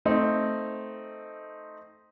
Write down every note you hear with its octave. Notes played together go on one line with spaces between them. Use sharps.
A3 C4 D#4